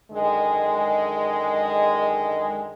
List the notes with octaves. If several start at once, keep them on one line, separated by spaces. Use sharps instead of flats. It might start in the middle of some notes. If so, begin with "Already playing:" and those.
F#2 D3 D#3 G#3